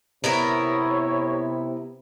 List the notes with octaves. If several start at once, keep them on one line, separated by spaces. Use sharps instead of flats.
C3 B3 E4 A#4 C#5